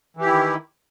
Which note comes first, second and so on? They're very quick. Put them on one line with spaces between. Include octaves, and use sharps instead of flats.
E3 G4 E4 D#3